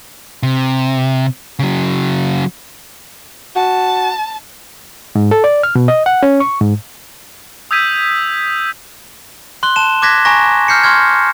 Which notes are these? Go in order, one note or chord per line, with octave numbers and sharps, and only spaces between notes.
C3
C#3 F#3
F#4 A5
G#2
A4
D5
F6
B2
D#5
F#5
C#4
C#6
G#2
D#6 E6 G6 G#6 B6 D#7
C6 F#6 G7
A5 E7
D6 F#6 G#6 A#6 B6
G#5 A#5 C#6 A#6
F6 G6 C7 C#7
C6 C#6 F6 G#6